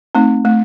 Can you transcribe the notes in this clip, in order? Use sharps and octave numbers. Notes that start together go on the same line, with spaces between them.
A3 C4 D#4
A3